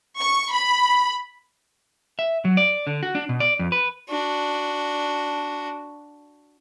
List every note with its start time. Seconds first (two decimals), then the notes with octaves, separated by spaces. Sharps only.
0.20 C#6
0.52 B5
2.19 E5
2.45 F#3
2.57 D5
2.87 D3
3.03 F#4
3.15 D4
3.29 B2
3.40 D5
3.59 F2
3.72 B4
4.08 D4 F#4